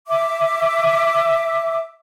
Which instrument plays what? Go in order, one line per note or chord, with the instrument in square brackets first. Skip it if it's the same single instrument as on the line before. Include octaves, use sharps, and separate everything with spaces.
[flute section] E5 D6